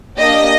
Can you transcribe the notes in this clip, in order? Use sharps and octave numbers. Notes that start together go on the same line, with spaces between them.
A#3 D4 G4 D#5